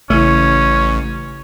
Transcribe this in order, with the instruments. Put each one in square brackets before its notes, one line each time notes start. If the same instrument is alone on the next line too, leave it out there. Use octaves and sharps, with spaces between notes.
[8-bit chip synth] A1 [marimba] C#3 E4 [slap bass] A3 [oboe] C#4